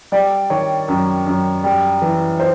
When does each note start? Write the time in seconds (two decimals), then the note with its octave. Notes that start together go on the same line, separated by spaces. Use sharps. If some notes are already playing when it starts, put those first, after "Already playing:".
0.12 G3 D5
0.50 D#3 C#5
0.88 F#2
1.26 F#2
1.64 G3
2.02 E3
2.40 C5